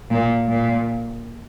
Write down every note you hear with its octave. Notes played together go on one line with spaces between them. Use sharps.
A#2
A#2